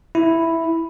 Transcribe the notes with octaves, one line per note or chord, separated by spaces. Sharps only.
E4